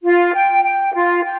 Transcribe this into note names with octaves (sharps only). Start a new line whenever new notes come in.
F4
G5
G5
F4
G5